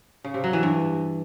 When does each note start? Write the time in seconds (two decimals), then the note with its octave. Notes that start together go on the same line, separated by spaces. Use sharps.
0.24 C#3
0.34 C3
0.44 F#3
0.53 E3
0.63 G2